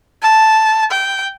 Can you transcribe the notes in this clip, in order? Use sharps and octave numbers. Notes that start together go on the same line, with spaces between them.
A5
G5